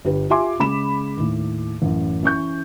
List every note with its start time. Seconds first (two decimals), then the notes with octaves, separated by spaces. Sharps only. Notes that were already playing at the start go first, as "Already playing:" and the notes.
0.05 G1 D4 G4 B4
0.30 F4 G4 E5 G#5 C6 D6
0.59 C#3 G#3 B5 E7
1.17 D#2 A2
1.82 A1 F#2
2.23 E3 C#4 C#6 G6